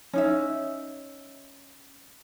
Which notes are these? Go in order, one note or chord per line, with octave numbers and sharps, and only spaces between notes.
C#4 D#4 E5